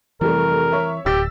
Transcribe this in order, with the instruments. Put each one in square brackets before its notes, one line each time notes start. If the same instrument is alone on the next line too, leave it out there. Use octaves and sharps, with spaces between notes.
[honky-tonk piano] F1 G3 A3 [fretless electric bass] E3 [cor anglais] A#4
[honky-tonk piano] C#5 E5
[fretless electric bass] D1 [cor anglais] G4 [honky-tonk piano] E6 A6 B6